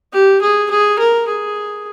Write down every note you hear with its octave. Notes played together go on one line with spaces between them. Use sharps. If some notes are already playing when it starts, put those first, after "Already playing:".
G4
G#4
G#4
A#4
G#4